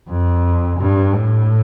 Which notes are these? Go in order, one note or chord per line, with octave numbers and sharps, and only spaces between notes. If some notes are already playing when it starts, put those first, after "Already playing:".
F2
G2
A2